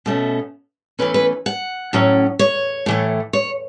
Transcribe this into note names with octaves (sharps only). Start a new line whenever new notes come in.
B2 A3 C#4
E2 E3 A3 C#4 B4
B4
F#5
A2 F#3 C#4
C#5
A2 E3 A3
C#5